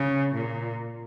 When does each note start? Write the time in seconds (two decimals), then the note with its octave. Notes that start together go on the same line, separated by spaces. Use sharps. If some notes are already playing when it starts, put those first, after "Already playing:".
Already playing: C#3
0.35 A#2